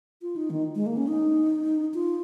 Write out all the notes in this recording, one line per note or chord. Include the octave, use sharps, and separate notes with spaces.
F4
D#4
D#3
G#3
A#3
C#4
D#4
F4